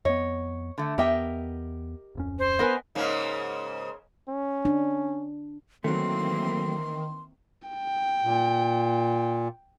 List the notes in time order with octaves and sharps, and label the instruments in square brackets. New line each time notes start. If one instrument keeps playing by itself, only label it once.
[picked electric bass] F2 B3 [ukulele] C#5 [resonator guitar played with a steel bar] D#5
[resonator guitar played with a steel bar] D3 A3
[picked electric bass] E2 B3 [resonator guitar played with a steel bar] G4 E5 G5 [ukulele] A#4 D#5
[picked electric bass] D1 F2 C#4
[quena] C5
[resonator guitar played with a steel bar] B3 A#4 B4 [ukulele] D#5 G#5
[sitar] G#2 C#3 A#3
[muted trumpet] C#4
[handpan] D4
[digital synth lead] D#3 [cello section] E3 A#3 C4 [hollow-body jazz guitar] F#3 A3 [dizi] C6
[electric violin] G5
[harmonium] A#2